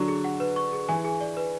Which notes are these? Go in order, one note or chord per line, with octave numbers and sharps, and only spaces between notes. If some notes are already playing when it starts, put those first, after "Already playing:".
Already playing: D3 F#3 C#6
G#4
F#5
B4
C#6
G#4
E3 G#5
G#4
D5
B4